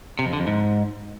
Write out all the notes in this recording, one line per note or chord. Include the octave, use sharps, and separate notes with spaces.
C3
F2
D3
F2
G#2